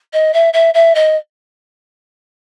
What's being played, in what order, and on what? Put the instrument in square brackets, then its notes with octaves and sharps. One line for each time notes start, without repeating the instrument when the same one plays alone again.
[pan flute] D#5
E5
E5
E5
D#5